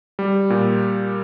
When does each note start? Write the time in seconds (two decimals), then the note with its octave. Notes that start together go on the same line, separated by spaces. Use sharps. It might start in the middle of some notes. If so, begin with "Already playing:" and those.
0.19 G3
0.50 A#2